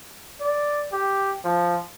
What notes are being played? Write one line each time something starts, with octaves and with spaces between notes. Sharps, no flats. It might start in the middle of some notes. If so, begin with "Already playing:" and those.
D5
G4
F3